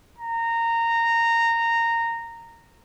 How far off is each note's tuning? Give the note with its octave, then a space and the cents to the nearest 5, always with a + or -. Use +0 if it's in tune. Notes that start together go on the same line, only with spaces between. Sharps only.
A#5 -15